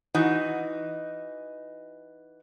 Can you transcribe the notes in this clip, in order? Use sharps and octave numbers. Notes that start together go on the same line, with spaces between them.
E3 D#4 F#4